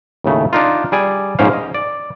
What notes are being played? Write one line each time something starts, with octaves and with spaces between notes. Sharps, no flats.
D#2 A2 C#3 A3
D4 D#4 F4
G3 G#4 D5 G#5
A#1 G#2 C#4 C5 F5
D#5
D5